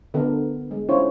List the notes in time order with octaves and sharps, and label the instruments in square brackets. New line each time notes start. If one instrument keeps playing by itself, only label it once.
[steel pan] D3 B3 D4 A4 A#4
G#3
C#4 D4 E4 F4 C5 C#5